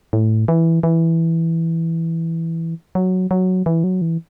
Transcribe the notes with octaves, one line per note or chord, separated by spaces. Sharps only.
A2
E3
E3
F#3
F#3
E3
F#3
E3